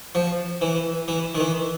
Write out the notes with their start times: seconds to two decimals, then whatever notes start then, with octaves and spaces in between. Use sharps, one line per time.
0.15 F3
0.61 E3
1.08 E3
1.35 D#3
1.40 E3